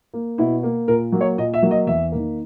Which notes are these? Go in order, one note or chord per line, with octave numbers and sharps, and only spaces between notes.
A#3
B2 E4
A#3
A#2 A#4
F#3 A#3
C#5
A#2 D#5
E5
F#3 A#3
D#5
E2 E5
D#3 A#3